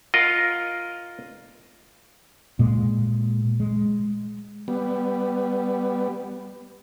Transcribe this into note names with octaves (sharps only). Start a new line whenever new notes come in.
F4 A#4 D#5 F#5
A#2 G#3
G#3
G3 B3